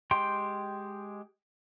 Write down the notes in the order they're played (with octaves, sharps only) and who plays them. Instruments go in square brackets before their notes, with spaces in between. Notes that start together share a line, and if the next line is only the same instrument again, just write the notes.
[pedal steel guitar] G#3 G4 G5 C6